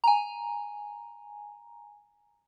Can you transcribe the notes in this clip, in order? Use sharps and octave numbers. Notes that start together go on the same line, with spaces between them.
G#5 A#5